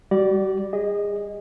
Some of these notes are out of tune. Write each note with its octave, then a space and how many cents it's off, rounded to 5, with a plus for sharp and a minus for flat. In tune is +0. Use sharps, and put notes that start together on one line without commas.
G3 +10 F#4 +45 D5 +0
G#4 -30 D#5 +0